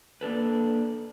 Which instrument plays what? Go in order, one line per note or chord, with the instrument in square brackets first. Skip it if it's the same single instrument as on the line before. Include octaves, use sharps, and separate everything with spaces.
[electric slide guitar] A#3 D4 A4 B4